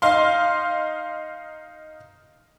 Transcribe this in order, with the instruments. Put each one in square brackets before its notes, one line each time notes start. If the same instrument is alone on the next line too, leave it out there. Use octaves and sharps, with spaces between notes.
[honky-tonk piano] D#4 F5 C6